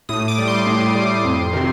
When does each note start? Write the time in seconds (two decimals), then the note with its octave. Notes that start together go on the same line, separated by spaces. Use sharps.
0.09 A2 D#6
0.28 D6
0.39 G3
0.48 C6
0.67 A2
0.95 G3
1.25 F2
1.53 C3 D#3